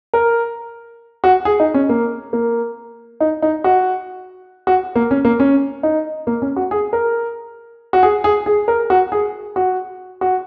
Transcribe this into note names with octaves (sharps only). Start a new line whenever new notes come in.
A#4
F#4
G#4
D#4
C#4
A#3
A#3
D#4
D#4
F#4
F#4
A#3
C#4
A#3
C#4
D#4
A#3
C#4
F#4
G#4
A#4
F#4
G#4
G#4
G#4
A#4
F#4
G#4
F#4
F#4